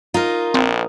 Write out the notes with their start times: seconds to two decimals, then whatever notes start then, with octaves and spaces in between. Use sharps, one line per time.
0.14 D#4 F4 A#4
0.54 A#1 C4